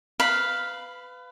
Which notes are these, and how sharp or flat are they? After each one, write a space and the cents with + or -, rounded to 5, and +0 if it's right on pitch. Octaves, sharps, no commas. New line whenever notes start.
B4 +25 F5 +0 B5 +0